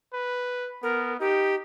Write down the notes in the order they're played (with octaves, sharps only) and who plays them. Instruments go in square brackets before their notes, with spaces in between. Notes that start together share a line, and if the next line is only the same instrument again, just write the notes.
[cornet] B4
[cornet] B3 [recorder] A#4
[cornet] D#4 [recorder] G4